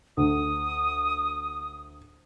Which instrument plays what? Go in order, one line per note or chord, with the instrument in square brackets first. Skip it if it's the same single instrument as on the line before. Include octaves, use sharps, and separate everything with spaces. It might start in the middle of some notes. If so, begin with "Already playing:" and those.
[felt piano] D2 [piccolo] D#6